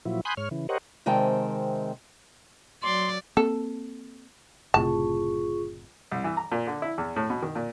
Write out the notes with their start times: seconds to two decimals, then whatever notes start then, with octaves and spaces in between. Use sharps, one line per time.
0.05 A#2 F3 F#3 E4
0.25 G#5 B5 C6 D#6 F#6 G6
0.37 G#2 C#5 F6
0.51 C#3 E3
0.69 G4 A#4 C5 C#5 D#5 F#5
1.06 C3 D#3 G#3 C4 G5 A5
2.83 F#3 D5 C6
3.37 A#3 C4 A4
4.74 F#1 A2 C3 F4 G#4 A5 C#6
6.12 C2
6.24 E3
6.37 A#5
6.52 A#2
6.67 D3
6.82 E4
6.98 E2
7.16 A2
7.30 B2
7.43 D#3
7.55 A#2